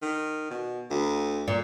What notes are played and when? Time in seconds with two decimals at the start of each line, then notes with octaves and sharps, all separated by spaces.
0.02 D#3
0.51 B2
0.91 D2
1.48 A#2